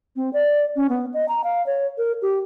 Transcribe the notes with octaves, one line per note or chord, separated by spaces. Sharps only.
C4
D5
C#4
B3
D#5
A#5
F5
C#5
A#4
G4